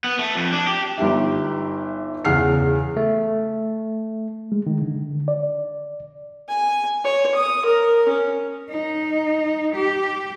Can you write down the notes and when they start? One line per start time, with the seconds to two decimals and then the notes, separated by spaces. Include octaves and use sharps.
0.04 B3
0.19 A3
0.36 F2
0.52 D4
0.67 G4
0.98 G1 D#4 G4 E5
2.25 E2 C#3 F#5 F6 C7
2.97 A3
4.52 G#3
4.67 D#3
4.82 D3
5.28 D5
6.49 G#5
7.04 C#5
7.35 D#6
7.66 A#4
8.08 C#4
8.70 D#4
9.76 G4